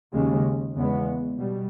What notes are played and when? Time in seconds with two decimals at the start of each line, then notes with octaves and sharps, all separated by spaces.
0.13 D#2 C#3 G#3
0.75 E2 C#3 G#3 B3
1.37 B2 G3